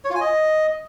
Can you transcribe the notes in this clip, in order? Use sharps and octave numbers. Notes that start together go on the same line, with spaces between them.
C#5
F4
G#5
D#5